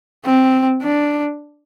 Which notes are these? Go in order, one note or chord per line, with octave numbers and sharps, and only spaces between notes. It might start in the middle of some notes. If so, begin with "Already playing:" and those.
C4
D4